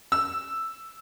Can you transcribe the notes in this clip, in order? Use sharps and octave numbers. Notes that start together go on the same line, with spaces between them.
E6